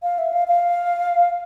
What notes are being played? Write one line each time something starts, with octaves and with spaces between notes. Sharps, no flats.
F5
E5
F5
F5